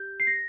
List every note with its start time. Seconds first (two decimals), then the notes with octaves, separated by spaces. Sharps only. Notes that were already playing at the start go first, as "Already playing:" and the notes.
Already playing: G4 G6
0.20 C7
0.27 A#6